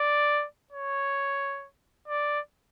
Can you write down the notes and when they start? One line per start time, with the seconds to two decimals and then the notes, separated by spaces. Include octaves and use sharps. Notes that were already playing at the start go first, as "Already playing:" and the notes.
Already playing: D5
0.73 C#5
2.08 D5